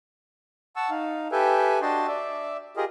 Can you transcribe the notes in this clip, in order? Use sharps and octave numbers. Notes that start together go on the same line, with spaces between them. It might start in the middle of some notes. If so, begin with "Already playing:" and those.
F#5 A5 C#6 E6
D#4 F5
G4 A4 B4 E5 G5 G#5
D4 F#4 D#5 G5 A5 C6
D5 E5
F4 G4 G#4 A#4 D#5